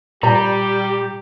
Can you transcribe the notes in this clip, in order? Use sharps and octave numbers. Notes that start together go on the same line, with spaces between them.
A#2 G3 G4 D5 A#5